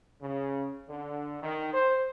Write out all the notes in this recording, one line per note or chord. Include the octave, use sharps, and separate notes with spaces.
C#3
D3
D#3
C5